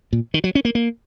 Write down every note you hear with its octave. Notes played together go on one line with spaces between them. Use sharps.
A#2
D#3
F#3
C#4
A#3
A#3